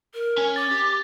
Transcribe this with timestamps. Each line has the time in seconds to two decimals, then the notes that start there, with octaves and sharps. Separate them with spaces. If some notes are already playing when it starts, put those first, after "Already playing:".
0.14 A#4
0.38 C#4 G#5
0.56 D6 A6
0.71 G4